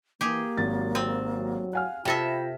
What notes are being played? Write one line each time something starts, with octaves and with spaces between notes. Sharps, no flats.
E3 A#3 G4 G#4
G#1 F#3 A6
C4
F#3
F5 F#5 G#5 F6
C3 F4 A4 E5 G5 B5 A#6